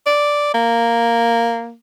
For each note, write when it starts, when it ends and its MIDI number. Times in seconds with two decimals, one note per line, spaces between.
0.06 0.53 74
0.54 1.74 58